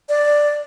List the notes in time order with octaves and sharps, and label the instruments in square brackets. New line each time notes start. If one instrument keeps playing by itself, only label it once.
[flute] D5